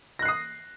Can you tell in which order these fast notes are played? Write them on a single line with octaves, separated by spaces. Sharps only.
A#6 F#6 C7 D#6